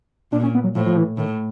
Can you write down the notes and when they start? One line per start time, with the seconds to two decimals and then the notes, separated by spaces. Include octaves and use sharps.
0.32 A#2 D4
0.43 C#4
0.55 B3
0.64 F#3
0.75 A2 F3
0.86 F3
0.97 E3
1.17 A2 D#3